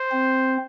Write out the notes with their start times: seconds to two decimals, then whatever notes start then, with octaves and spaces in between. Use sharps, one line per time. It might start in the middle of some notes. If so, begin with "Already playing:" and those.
Already playing: C5
0.12 C4